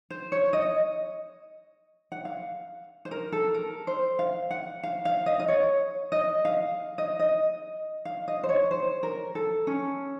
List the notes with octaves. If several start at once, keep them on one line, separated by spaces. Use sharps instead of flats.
C5
C#5
D#5
F#5
F5
C5
A#4
A4
A#4
C5
F5
F#5
F5
F5
D#5
D#5
C#5
D#5
F5
D#5
D#5
F5
D#5
C5
C#5
C5
A#4
A4
C#4